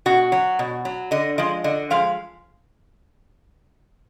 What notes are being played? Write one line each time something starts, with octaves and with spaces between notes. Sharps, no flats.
B2 F#4
F#3
B2
F#3
D3 D#5
F3 G#3 D#5
D3 D#5
F3 G#3 F5